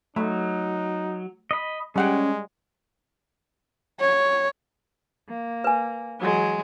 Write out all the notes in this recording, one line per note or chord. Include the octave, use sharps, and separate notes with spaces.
F#3 A3 D#4
D#5 B5
G3 G#3 C#4 F#5 G5
C#5
A#3
B4 G#5
E3 F#3 G#3